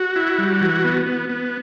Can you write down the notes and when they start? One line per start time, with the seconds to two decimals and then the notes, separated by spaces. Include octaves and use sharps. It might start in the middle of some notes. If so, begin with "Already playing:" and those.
Already playing: F#4
0.16 E4
0.38 G3
0.61 E3
0.84 B3
1.06 B3
1.29 B3